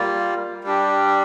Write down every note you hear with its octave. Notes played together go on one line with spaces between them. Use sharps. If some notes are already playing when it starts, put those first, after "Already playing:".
Already playing: G3 A#3 F4
G3 D4 G4